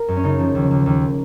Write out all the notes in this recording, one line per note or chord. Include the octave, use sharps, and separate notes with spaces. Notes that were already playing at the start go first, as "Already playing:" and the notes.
Already playing: A#4
F#2
C#4
C#3 D#4
F3
D#2
D#2
D#2